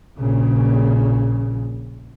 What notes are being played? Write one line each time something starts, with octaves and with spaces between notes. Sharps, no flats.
A#1 A#2 C#3